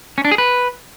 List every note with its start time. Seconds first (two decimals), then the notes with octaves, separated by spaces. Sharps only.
0.18 C#4
0.25 D4
0.31 G#4
0.38 B4